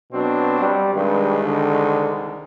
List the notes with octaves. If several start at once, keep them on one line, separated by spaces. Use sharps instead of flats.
B2 F#3 C4 D4
G3
C2 G2 D#3 G#3
D3